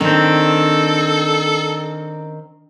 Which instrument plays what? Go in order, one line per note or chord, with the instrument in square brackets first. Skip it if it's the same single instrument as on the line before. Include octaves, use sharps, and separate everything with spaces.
[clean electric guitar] D#3 C4 [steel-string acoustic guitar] D4 [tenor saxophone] A4